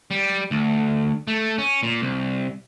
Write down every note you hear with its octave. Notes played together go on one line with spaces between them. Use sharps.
G3
D2
A3
C#4
A#2
C2